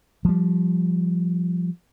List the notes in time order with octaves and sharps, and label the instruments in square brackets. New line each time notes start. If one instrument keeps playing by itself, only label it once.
[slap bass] F3 G3